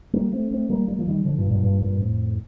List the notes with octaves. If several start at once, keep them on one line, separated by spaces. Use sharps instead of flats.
G3 A#3
A3 C4
A3 C4
G3 A#3
G3 A#3
F3
D#3 G3
D3 F3
G2 A#2
G2 A#2
G2 A#2
G2 A#2
F2 A2